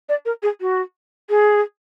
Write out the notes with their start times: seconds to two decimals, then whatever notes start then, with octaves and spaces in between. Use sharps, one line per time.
0.09 D5
0.25 A#4
0.43 G#4
0.61 F#4
1.30 G#4